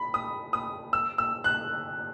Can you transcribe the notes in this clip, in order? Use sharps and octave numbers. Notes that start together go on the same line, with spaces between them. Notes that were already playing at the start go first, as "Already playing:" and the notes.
Already playing: B5
D#6
D#6
E6
E6
F#6